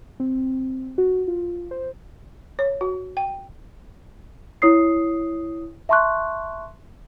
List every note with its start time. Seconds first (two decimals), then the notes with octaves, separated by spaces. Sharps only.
0.20 C4
0.98 F#4
1.28 F4
1.71 C5
2.59 C#5
2.81 F#4
3.17 G5
4.62 E4 C#5 D#6 C7
5.89 E5 A5 C6 C#6 F#6